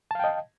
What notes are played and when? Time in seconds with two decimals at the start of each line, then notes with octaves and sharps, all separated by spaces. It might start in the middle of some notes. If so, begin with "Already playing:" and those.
0.11 A5
0.15 F5
0.20 G5
0.24 D#5